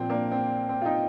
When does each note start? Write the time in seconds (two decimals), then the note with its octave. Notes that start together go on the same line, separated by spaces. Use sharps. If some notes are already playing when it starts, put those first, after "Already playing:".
Already playing: A#2 F3 C4
0.10 A#3 D4
0.32 C4
0.69 C4
0.81 F4
0.85 C4 D#4